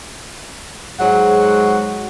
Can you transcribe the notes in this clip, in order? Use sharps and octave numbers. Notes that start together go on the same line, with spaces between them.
G#2 F#3 G#3 F#4 F#5